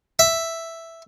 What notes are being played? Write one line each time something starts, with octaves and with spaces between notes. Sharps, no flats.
E5